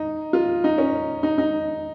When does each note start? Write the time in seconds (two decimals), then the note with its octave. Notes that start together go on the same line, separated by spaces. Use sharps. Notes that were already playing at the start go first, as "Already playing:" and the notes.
Already playing: D#4
0.33 F4
0.64 D#4
0.78 C#4
1.23 D#4
1.38 D#4